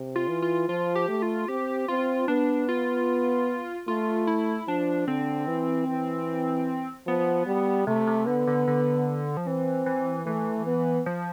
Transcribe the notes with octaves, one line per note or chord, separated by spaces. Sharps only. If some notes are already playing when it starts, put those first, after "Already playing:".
Already playing: C3
F4
E3
F4
F3 F4
G4
A3
F4
C4 G4
C4 F4
B3 D4
F4
A3 F4
E4
F3 D4
D3 C4
E3
E3
F3 B3
G3
C3 A3
C3
D3 B3
D3
D3
F3
E3 C4
E3
E3 A3
B3
F3